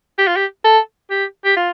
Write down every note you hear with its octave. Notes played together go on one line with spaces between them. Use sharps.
G4
F4
G4
A4
G4
G4
F4